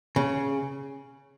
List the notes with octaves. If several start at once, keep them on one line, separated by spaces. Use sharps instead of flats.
C#3